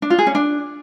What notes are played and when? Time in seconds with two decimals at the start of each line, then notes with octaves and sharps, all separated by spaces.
0.02 D4
0.10 F4
0.19 G#4
0.27 C#4
0.35 D4